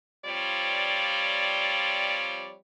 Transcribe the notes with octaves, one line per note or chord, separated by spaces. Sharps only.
F3 G3 C4 F4 C#5 D5